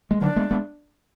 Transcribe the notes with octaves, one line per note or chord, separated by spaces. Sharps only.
G#3
D3 F#3 D4
G#3 B3
G#3 B3